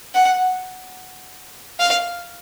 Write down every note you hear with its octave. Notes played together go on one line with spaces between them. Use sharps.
F#5
F5